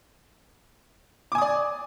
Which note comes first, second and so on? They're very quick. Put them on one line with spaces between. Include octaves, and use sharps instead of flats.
D6 G#5 D#6 D5